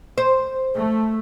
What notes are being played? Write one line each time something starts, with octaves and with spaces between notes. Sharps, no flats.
C5
A3